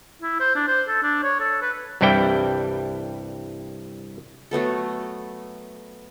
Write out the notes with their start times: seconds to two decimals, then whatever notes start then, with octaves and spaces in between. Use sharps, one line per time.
0.22 E4
0.40 C5
0.55 D4
0.68 C5
0.88 A4
1.03 D4
1.23 C#5
1.41 A4
1.62 B4
2.01 C2 G2 E3 G3 E4 G5
4.51 F#3 A3 B3 A4